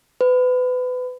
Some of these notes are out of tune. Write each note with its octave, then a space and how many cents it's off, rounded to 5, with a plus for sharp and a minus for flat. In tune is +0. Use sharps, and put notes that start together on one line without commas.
B4 +30